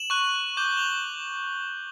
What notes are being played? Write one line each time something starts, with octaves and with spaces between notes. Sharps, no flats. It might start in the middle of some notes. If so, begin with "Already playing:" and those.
Already playing: E7 F#7
C#6 F#6
D6 G6 G7
F7 G7